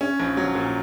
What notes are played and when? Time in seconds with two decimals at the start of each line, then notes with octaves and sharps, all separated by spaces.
0.01 C#4
0.20 A#1
0.37 F#3
0.55 A#2